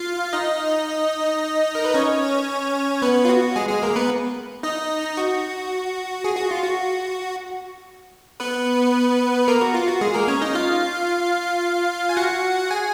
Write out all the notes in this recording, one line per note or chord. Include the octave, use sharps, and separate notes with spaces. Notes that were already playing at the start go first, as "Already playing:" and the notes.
Already playing: F4 F5
D#4 D#5
A#4
B4
C#4 C#5
B3 B4
F4
F#4
G#3 G#4
G#3 G#4
A#3 A#4
B3 B4
D#4 D#5
F#4
G#4
F#4
F4
F#4
B3 B4
A#3 A#4
F#4
F4
F#4
G#3 G#4
A#3 A#4
C#4 C#5
D#4 D#5
F4 F5
G#5
F#4 F#5
G#4 G#5